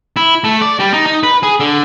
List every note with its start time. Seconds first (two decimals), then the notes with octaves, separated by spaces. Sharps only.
0.16 E4
0.44 A3
0.61 D5
0.80 G3
0.94 D#4
1.06 D#4
1.23 B4
1.43 G#4
1.60 D3